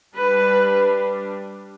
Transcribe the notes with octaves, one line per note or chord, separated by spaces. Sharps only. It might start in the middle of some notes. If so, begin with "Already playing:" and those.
G3 D4 B4